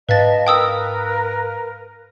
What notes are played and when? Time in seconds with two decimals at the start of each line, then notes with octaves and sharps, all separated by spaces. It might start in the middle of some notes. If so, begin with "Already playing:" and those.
0.09 G#2 B4 D#5 F5 A5 A6 B6
0.47 A#4 B4 G5 D#6 E6